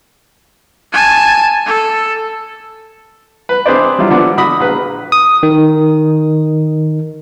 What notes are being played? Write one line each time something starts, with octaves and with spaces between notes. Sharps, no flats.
G#5 A5
A4
B4
C4 D4 G#4 B4 C5 D5
F#3 G3 D4 E4 F4
D3 F3 B3 D4
D3 F#4 B5 D#6
A#1 B4
D#6
D#3